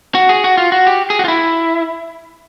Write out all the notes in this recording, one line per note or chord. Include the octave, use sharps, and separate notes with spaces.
F#4
G#4
F#4
F4
F#4
G4
G#4
F#4
F4
E4